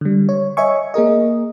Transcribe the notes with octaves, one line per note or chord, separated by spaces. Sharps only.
D3 G3
C#5
C#5 D#5 E5 G#5 C#6
A#3 G#4 A#4 D#5